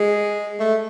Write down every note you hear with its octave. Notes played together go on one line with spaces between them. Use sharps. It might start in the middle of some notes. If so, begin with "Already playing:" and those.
Already playing: G#3
A3